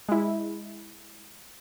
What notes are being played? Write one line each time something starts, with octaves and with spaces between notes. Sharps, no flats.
G#3 E4